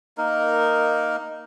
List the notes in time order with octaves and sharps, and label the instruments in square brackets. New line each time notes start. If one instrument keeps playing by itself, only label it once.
[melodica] A#3 D#4 A#4